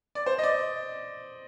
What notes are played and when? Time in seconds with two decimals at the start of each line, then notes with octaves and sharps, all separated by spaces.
0.15 D5
0.26 C5
0.38 D#5
0.43 D5